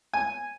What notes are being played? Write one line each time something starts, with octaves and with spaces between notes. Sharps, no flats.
G#5